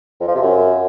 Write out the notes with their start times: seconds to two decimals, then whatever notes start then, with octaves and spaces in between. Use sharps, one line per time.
0.21 F2
0.28 F3
0.35 C3
0.42 F#2